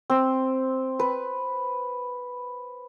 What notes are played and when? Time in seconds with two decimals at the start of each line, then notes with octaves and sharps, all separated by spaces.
0.10 C4
0.99 B4